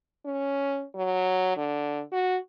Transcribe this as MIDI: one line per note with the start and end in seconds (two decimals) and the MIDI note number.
0.25 0.84 61
0.95 1.55 54
1.57 2.02 50
2.12 2.37 66